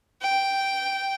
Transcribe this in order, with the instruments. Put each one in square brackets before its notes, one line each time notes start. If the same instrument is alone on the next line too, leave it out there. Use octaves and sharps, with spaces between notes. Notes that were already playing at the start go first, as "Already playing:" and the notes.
[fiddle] G5